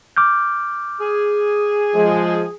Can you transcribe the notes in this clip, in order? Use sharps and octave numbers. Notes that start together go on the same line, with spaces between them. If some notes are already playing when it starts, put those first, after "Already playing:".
D6 F6 G6
G#4
F3 G#3